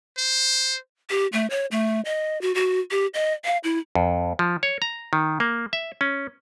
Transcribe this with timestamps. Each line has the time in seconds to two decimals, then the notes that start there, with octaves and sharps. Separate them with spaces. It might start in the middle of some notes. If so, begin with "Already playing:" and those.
0.17 C5
1.10 G4
1.33 A3
1.50 C#5
1.71 A3
2.05 D#5
2.42 F#4
2.55 F#4
2.91 G4
3.14 D#5
3.45 F5
3.64 E4
3.95 F2
4.39 F3
4.63 C#5
4.82 A#5
5.13 D#3
5.40 A#3
5.73 E5
6.01 C#4